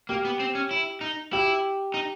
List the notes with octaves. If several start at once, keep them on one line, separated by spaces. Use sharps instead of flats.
A#3 G4
B3
C4
C#4
E4
D#4
E4 G4
D#4